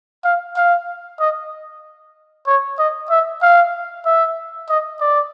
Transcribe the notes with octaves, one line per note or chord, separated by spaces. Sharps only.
F5
F5
D#5
C#5
D#5
E5
F5
E5
D#5
D5